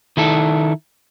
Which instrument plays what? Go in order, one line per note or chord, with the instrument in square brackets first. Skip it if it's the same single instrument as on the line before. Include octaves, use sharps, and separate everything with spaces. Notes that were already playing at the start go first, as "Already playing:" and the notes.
[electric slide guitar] D#3 E4 A4